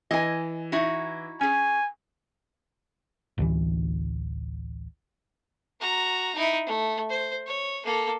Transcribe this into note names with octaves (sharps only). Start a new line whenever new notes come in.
E3 D#5 G#5
D#4 E4 F#4
C#4 G#4 G#5
A1 D2 E3
F#4 A#5
D#4 E4
A3
C5
C#5
A#3 A4